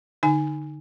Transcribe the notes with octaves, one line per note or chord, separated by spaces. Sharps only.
D3 D#4 G#5